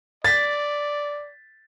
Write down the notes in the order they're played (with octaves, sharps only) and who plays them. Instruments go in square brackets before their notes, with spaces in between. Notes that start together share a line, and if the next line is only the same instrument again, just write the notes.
[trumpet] D5 [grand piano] A6 B6